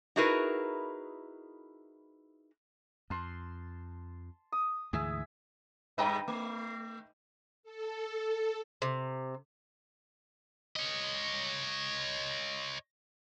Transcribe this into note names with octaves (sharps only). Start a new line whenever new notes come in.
D#4 E4 F#4 G#4 A#4 B4
F2 A5 C6
D#6
D2 G#2 E3 G#4 E5
G2 B4 D#5 G5 A#5 B5
A3
A4
C3
C#5 D#5